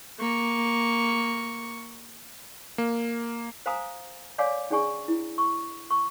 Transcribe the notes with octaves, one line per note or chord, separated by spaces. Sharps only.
A#3 C#6
A#3
C5 F5 G#5 A#5 D#6
C#5 D5 F5 G#5 D6
C#4 D4 G#4 D5 G#5 C#6
E4
C#6
C#6